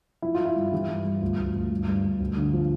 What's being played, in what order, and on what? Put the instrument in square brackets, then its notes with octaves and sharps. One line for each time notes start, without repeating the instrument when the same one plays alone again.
[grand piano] F3 E4
F4
F3
E4
G2
E3 G4
G2
G2
D2 F4
D2
D2
G2
G2
G2
D2
D3
F3